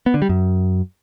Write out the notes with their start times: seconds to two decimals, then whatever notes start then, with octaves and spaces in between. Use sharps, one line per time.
0.06 B3
0.14 D3
0.22 G3
0.29 F#2